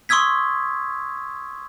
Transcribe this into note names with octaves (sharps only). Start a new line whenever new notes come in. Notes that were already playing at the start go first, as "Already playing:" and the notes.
C6 C#6 D#6 E6 G#6 B6